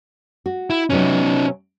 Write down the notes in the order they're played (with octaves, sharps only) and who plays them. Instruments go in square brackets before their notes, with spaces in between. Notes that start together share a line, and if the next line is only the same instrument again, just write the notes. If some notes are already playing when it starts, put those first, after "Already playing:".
[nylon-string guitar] F#4
[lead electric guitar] E4
[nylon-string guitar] C3 F#3 B3 [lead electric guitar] C#4 D#4